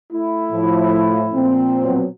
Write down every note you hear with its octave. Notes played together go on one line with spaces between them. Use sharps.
A3 E4
A2 F3
A#2 F3 C4
B2 F#3